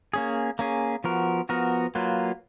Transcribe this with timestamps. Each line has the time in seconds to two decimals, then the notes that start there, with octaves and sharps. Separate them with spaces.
0.14 A#3 C#4 G#4
0.59 A#3 C#4 G#4
1.04 F3 B3 F#4 A#4
1.49 F3 B3 F#4 A#4
1.95 F#3 A#3 F4 B4